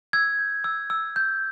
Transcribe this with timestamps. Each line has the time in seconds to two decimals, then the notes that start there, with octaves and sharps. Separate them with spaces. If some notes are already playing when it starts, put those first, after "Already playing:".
0.13 E6 G#6
0.39 G6
0.64 E6
0.90 E6
1.16 G6